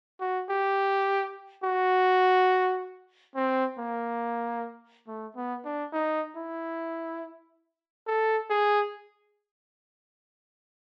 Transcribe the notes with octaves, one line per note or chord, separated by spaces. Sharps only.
F#4
G4
F#4
C4
A#3
A3
B3
D4
D#4
E4
A4
G#4